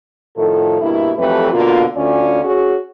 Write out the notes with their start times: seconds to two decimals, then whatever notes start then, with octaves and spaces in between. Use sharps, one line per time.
0.36 A2 D#3 F3 F4 A4
0.81 G2 B2 A#3 E4
1.18 F2 E3 F#3 A3 G4 B4
1.52 B2 D3 A#3 F4
1.96 D2 D3 C#4 F4 D5
2.43 C#4 F#4 G#4